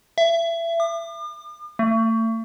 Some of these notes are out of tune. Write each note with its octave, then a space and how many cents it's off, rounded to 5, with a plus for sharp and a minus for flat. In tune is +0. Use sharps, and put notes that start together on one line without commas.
E5 +25
D6 +45
A3 +40